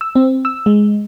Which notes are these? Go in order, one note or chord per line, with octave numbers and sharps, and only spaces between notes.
E6
C4
E6
G#3